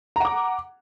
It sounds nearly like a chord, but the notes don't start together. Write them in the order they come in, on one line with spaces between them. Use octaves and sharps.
A#5 F#5 D6